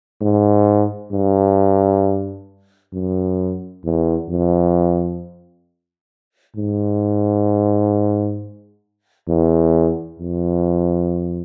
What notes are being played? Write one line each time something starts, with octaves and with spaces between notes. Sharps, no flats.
G#2
G2
F#2
E2
F2
G#2
E2
F2